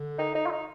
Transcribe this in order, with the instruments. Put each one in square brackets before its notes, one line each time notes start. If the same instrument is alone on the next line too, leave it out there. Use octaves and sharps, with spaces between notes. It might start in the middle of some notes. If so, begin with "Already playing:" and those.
Already playing: [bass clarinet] D3
[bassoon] D#4
D#4
F4
D#4